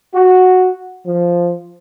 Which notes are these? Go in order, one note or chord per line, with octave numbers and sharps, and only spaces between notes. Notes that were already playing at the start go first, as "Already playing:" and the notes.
F#4
F3